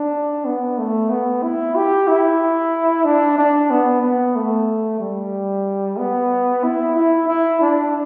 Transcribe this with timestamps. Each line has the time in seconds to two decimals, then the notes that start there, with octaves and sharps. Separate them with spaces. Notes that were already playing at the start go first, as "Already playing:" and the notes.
Already playing: D4
0.45 B3
0.78 A3
1.10 B3
1.43 E4
1.76 G4
2.08 E4
3.05 D4
3.38 D4
3.70 B3
4.03 B3
4.36 A3
5.00 G3
5.98 B3
6.64 E4
6.96 E4
7.28 E4
7.61 D4